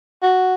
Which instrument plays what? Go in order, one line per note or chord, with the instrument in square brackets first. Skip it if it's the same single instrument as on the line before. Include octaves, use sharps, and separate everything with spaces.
[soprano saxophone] F#4